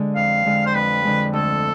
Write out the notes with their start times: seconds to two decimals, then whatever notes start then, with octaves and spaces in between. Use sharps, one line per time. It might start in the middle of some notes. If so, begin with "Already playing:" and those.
Already playing: D3 G#3
0.16 F2 F5
0.46 D3 G#3
0.66 C5
0.75 F2 B4
1.04 D3 G#3
1.33 D2 A4